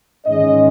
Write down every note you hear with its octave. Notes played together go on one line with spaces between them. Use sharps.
G#2 D#3 G#3 C#4 D#5